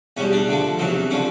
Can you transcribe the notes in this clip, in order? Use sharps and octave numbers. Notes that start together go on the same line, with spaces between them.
E2 B2 G3 C#4
D4
D2 D3 F3
E2 C3 D#3 F#3
D3 F3 C#4